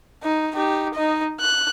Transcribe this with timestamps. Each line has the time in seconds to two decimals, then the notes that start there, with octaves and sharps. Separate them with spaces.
0.23 D#4
0.55 D#4 G4
0.94 D#4 D#5
1.41 F#6